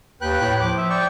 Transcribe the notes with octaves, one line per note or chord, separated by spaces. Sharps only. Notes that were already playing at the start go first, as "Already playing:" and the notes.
D#2 B4 G5 F#6
A2
F3 D6
E5
D5 G5 C#6